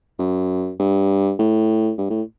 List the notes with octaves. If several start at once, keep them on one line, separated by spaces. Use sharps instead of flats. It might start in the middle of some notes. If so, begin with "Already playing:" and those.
F#2
G2
A2
G2
A2